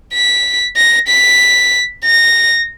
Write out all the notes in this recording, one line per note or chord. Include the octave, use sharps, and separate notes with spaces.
B6
A#6
B6
A#6